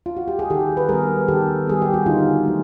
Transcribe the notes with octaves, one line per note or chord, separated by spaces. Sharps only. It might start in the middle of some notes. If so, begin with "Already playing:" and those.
F4
F#4
G4
G#4
D#3 G4 A4
B4
G3 B3 G#4 A#4
D#3 G4 A4
G3 B3 G#4
G4
F#4
D3 D#4 F4
F#3 A3